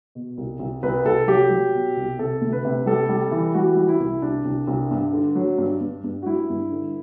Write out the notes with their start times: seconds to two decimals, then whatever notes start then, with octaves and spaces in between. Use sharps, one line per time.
0.15 B2
0.38 C2
0.59 C2
0.83 C2 B4
1.05 C2 A4
1.27 F#3 G4
1.50 F#3
1.74 B2
1.97 C2
2.19 C3 A4
2.41 D2
2.52 B4
2.64 C3
2.86 G3 A4
3.09 G3
3.31 E3
3.54 G3 F#4
3.77 G3
3.88 E4
4.00 C2
4.22 C2 D4
4.45 C2
4.67 C2
4.91 G2
5.13 D3
5.36 F#3
5.58 G2
5.81 G2
6.04 G2
6.22 F#4
6.26 G3 E4
6.50 G2
6.71 D3